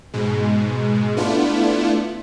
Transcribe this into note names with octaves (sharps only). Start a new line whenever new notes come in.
G#2 B2 G#3
A3 B3 D4 E4 F4